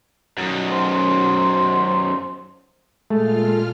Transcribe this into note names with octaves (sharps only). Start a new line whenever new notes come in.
F#2 D#3
C5
A#2 G#3 A3 F4 A4 F6